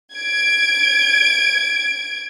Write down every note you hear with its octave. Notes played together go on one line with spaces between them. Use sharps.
G#6 D7